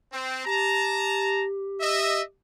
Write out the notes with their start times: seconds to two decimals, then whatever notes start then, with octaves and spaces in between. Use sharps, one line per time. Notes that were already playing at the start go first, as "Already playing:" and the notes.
0.12 C4
0.45 G4 A5 A#5
1.80 D#5 E5